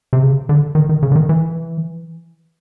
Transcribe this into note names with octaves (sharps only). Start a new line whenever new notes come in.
C3
C#3
D3
D#3
D#3
C#3
D3
D#3
E3